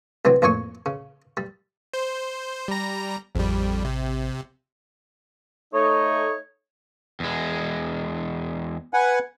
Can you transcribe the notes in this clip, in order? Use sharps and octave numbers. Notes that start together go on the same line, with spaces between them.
C2 E3 F#3 C4
A1 F2 A#2 C#5 G#5 C#6
C#3
G3
C5
G3 A#5
A1 F2 G3
C3
A3 D#4 C#5
E2 G#3
B4 F#5 G#5